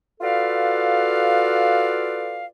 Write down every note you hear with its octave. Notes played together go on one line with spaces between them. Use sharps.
F4 F#4 A4 B4 D5 F5